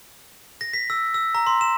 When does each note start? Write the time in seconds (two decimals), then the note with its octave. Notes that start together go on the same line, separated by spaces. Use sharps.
0.61 A#6
0.73 B6
0.90 E6
1.14 E6
1.35 A#5
1.47 C6
1.61 E7